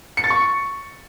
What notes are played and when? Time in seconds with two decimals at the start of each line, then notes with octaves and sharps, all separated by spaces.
0.17 C#7
0.24 A6
0.30 C#6